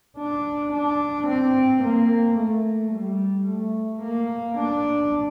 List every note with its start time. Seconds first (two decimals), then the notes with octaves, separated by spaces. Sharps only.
0.18 D4
0.73 D4
1.28 C4
1.84 A#3
2.37 A3
2.93 G3
3.48 A3
4.02 A#3
4.58 D4